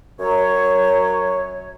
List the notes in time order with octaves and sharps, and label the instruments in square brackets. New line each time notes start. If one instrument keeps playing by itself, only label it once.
[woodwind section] F#2 F#3 C#5